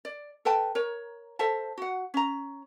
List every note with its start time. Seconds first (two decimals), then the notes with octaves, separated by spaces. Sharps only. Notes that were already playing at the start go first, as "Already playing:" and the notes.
0.05 D5
0.45 A4 B4 G5 A5
0.75 A#4 C#5
1.39 A4 C5 E5 A5
1.78 F#4 F#5
2.14 C#4 A#5